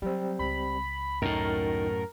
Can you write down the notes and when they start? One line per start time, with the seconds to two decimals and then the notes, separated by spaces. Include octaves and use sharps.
0.02 F#3 G3 C4
0.39 C#2 B5
1.22 F#2 A2 D#3 A#4